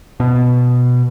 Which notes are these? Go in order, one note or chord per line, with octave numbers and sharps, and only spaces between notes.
B2